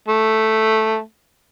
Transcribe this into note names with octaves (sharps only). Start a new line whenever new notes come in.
A3